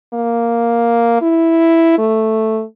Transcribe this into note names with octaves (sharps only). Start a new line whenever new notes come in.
A#3
E4
A3